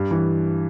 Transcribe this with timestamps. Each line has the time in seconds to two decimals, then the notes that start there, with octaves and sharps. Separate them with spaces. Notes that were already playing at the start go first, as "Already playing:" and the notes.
Already playing: G2
0.11 E3